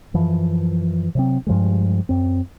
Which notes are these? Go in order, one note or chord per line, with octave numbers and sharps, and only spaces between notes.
F#2 E3 F3
C3 F#3 C4
G2 F3 G3 G#3
F#2 C4